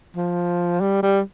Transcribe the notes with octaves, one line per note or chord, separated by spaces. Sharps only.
F3
G3
G3